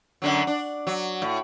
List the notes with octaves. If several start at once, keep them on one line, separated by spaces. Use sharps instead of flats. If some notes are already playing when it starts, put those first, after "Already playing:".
F#2 D3 F#3
D4
F#3
A2